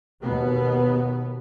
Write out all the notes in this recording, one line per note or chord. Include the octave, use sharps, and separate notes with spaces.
D#2 B2 B3